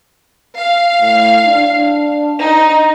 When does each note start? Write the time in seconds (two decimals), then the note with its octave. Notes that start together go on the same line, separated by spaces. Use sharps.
0.59 F5
1.00 A2
1.46 D4
2.40 D#4